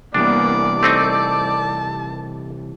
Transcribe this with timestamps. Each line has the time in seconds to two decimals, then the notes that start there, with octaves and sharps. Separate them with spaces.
0.14 C3 E3 G3 A#3 B3 D4 D5
0.83 A3 C4 D#4 A5